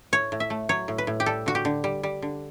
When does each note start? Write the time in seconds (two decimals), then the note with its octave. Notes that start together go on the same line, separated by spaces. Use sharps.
0.13 A2 C#5
0.32 A2
0.40 E5
0.50 A3
0.69 F#3 C#5
0.88 A2
0.98 B4
1.07 A2
1.20 G4
1.26 G3 A4
1.46 D3 F#4
1.55 G4
1.65 D3
1.84 G3
2.03 G3
2.22 D3